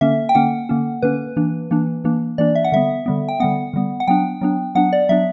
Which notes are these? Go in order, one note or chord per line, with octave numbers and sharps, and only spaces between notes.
D3 A#3 C#4 E5
G5
D3 A#3 C#4 F#5
D3 A#3 C#4
D3 A#3 C#4 B4
E3 A#3 D4
E3 A#3 D4
E3 A#3 D4
E3 A#3 D4 D5
E5
F#5
D3 G3 B3 E5
D3 G3 B3
G5
D3 G3 B3 F#5
D3 G3 B3
F#5
F#3 B3 D4 G5
F#3 B3 D4
F#3 B3 D4 F#5
D5
F#3 B3 D4 E5